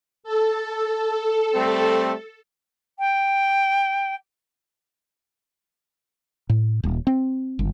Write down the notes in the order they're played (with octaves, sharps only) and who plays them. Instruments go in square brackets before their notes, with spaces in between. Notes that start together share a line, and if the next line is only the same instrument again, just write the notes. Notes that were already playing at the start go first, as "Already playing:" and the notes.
[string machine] A4
[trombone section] G3 A3 C4
[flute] G5
[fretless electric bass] A2
D#1
C4
G1